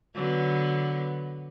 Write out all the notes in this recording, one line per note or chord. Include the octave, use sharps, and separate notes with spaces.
D3 F#3 B3